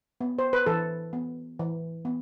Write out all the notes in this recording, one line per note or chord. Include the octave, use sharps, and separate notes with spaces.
B3
C5
B4
E3 A4
B3
E3
B3